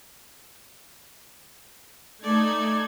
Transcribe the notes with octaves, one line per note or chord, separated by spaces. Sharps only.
A3 D#4 A4 D5 G#6